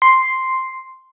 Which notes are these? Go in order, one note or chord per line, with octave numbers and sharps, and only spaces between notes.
C6